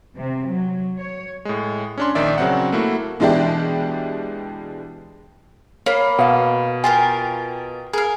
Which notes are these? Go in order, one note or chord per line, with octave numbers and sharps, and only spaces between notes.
C3
F#3
C#5
A2 G#3
C#4 D4 C6
A#1 D#3 D5 E5
C#3 F#3 C4 F#5
A3 A#3 E4 F#4
B2 E3 G#3 D4 E4 G4
A#3 C#5 F5 B5
B2 F5 F#5
F4 G4 A#4 G#5
G#4 A#4 F5